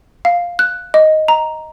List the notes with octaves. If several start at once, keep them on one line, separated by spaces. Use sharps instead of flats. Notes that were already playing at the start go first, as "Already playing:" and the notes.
F5
F#6
D#5
A#5